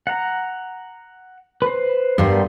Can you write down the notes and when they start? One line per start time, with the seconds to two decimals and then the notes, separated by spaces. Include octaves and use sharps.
0.07 F#5 A#5
1.62 B4 C5
2.18 G2 G3 B3 A#4 C6